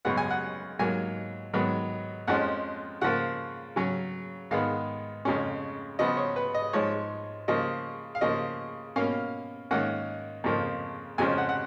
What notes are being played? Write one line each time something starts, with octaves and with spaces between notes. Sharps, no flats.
F#2 C#3 G#3 B3 F#5
G#5
F#5
G#2 F#3 A#3 G#5
G#2 D#3 F#3 B3
F2 F3 G#3 C#4 F#5
C#3 F3 A#3 F#5
C#3 F#3 C#4
G#2 D#3 G#3 B3 F5
F2 C#3 G#3 C#4
C#3 F3 B3 D#5
C#5
B4
D#5
G#2 F3 G#3 C#5
C#3 F3 A#3 D#5
F5
C#3 F3 A#3 D#5
B2 A#3 C#4 F5
G#2 D#3 A#3 C#4 F#5
F2 C#3 F3 A#3
F2 C#3 F3 G#3 C#4 G#5
F#5
F#5